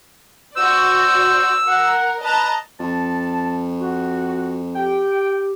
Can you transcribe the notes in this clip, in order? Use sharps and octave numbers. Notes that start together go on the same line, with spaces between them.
F#4 C5 D5 E6
A#4 F#5
B4 D#5 A5 A#5
F2 A5
F#4
G4 G5